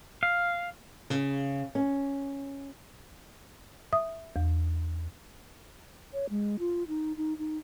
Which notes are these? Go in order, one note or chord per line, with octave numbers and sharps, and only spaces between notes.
F5
C#3
C#4
E5 D#6
E2
C#5
G#3
F4
D#4
D#4
D#4